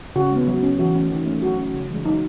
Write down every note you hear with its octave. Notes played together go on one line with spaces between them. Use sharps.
C#3 F#4
G#3 B3
F#3
C#4
E3 F#4
A3 C#4
D#3
A3 C#4
F#3 F#4
C#4
C#3
E3 G#3
F#3 D#4